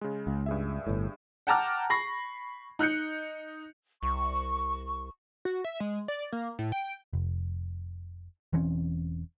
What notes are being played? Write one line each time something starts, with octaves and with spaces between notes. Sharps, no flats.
C#3 G#3
C#2
G2 G#4 E5
G1 A2
F#5 G5 A5 A#5 D6 F6
B5 C#6 A#6 C7
D#4 F#6 G6 C#7
C2 C#6
F#4
E5
G#3
D5
A#3
A2
G5
F1
E1 E3 C4 C#4